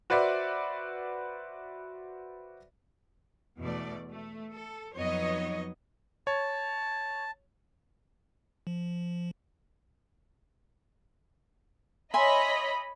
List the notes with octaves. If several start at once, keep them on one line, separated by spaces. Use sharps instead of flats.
F#4 B4 C5 D5 E5
E2 B2 A3 D5
A3
A4
F2 F#3 B3 D#4 C#5 D#5
C#5 A5
F3
C#5 D#5 E5 G#5 B5 C6